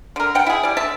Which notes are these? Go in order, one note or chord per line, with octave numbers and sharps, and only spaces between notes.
D3 A#4
B2 F#5 G5
E4 G#4
G3 D5
D3 E5 A5